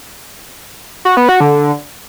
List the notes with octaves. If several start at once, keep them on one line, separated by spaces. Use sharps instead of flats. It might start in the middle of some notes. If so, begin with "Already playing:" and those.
F#4
B3
F#4
D3